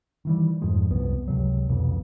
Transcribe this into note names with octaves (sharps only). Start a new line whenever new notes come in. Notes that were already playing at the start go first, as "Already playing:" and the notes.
D#3 E3 G3
F2 G#2 F3 G#3
C2 F#2 B3
C#2 C3 F#3
E1 C2 F2 B2